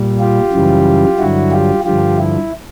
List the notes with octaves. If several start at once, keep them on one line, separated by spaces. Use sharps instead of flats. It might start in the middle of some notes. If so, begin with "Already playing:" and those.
Already playing: A#2 G3
F4 G4
F#2 C#3 E3 G3
G2 D3 F#3 E4 F#4
F4 G4
G2 D3 F3 F4 G4
E4